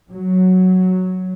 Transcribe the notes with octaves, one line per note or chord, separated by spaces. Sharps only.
F#3